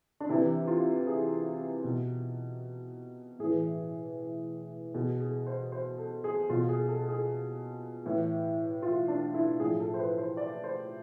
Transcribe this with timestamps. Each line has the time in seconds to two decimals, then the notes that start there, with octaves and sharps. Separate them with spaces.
0.20 D4
0.29 C3 E3 E4
0.67 F4
1.07 G#4
1.84 B2
3.39 A2 E3 G#4
4.94 B2 G#4
5.21 G#4
5.47 C5
5.72 C5
5.98 A4
6.24 G#4
6.49 B2 F4
6.69 G#4
6.88 A4
7.09 G#4
8.06 A2 E3
8.82 F4
9.08 D4
9.34 E4
9.60 A2 F3 G#4
9.80 A4
9.94 C5
9.99 B4
10.18 C5
10.37 D5
10.64 C5